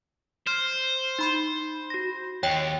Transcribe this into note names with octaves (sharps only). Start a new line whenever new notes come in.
C5 F6
D#4 B5 C6
F#4 A#6
D#2 C#5 G5